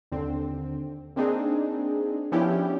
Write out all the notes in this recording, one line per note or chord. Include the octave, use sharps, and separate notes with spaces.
D#2 D3 C4
A#3 C4 D4 D#4 G#4
F3 B3 C#4 D4 E4 G4